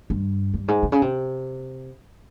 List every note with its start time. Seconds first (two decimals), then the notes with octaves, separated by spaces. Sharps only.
0.10 G2
0.54 G2
0.68 G#2
0.83 C3
0.92 C#3
1.02 C3